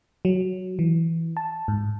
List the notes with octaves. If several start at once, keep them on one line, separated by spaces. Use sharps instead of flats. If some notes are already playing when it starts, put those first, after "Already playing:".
F#3
E3
A5
G#2